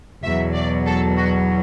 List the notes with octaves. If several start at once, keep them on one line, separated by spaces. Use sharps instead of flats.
E2 B2 F#3 E5
D5
A4
F#4